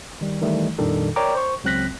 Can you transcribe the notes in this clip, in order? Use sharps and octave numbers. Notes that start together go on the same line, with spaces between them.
D#3 G3
D#3 E3 G3 A3
F2 A#2 D#3 G3 D4 A4
A#4 C#5 D5 G5 A#5 D6
C5 C#6
C#2 F#3 C4 F#6 A#6 B6